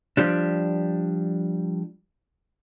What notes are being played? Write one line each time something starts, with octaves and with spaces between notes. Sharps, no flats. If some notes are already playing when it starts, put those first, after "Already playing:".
F3 G3 D4